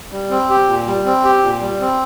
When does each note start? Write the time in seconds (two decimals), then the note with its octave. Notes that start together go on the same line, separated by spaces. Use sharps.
0.12 G3
0.30 C4
0.50 G4
0.68 A#2
0.87 G3
1.05 C4
1.24 G4
1.43 A#2
1.61 G3
1.80 C4